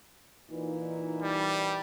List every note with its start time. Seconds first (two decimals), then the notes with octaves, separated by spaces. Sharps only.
0.49 A#2 E3 D#4
1.23 G3